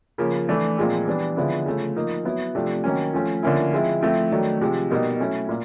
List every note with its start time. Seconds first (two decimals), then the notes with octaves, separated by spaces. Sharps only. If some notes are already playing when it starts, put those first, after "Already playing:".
0.18 C#3 F3 A#3
0.49 E3 A3 D4
0.78 A#2 F3 G#3 C4
1.08 E3 G3 B3 D4
1.37 D3 F3 G#3 B3 E4
1.66 C#3 F3 A3
1.96 F3 A#3 D#4
2.25 F#3 B3 E4
2.55 C3 F3 A3 D4
2.84 D#3 F#3 A#3 C#4
3.13 F3 A3 C#4
3.43 D3 F3 A#3 C#4 E4
3.72 F3 G#3 C4 E4
4.02 F3 A3 C4 E4
4.32 D#3 F#3 A3 D4
4.61 C3 F3 G#3
4.90 B2 G3 A#3 D#4
5.20 F#3 A3 C#4 E4
5.49 A#2